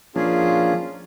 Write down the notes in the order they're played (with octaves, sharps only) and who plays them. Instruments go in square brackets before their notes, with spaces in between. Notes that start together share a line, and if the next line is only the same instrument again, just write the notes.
[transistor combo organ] F3 A#3 D4 [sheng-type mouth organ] C#4 F4 G#4